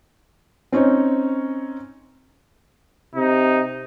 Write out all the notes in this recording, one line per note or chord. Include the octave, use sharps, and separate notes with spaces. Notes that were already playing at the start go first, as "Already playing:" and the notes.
C4 C#4 D#4 C#5
C3 D#4